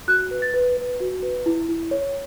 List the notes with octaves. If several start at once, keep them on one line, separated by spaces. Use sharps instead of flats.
F#4 F#6
B4
A6
B4
B4
F#4
B4
E4
E4
C#5